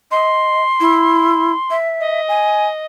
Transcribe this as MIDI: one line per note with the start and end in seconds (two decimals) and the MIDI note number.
0.11 0.63 75
0.11 1.75 84
0.80 1.53 64
1.70 2.21 76
2.00 2.86 75
2.28 2.66 80